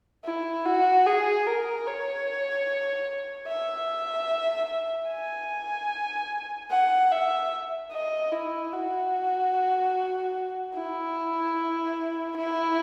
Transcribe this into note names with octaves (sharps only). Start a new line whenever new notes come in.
E4
F#4
G#4
A#4
C#5
E5
G#5
F#5
E5
D#5
E4
F#4
E4
E4